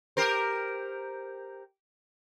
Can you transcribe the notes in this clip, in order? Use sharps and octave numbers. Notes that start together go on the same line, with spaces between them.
G4 A#4 C5